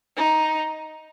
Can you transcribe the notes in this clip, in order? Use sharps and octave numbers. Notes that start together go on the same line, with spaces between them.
D#4